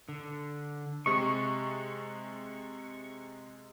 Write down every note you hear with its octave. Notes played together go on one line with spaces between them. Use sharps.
D3
C3 G#3 C#6 D#6